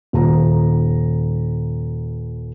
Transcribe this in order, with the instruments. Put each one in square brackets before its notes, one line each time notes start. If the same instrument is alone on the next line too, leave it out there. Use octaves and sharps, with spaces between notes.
[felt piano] D#1 A#5